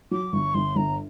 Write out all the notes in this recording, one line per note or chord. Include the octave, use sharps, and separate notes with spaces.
F#3 D6
G1 C#6
G1 C6
G1 A#5